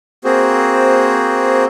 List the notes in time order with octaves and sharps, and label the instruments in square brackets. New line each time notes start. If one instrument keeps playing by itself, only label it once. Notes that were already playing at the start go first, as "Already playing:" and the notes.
[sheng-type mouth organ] A#3 C4 F#4 G#4 C5